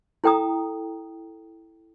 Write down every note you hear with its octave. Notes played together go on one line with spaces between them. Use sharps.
E4 A4 G5 A#5 D#6